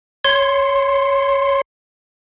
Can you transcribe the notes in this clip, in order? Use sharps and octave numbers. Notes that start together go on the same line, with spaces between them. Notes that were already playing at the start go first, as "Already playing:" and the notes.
C#5 C6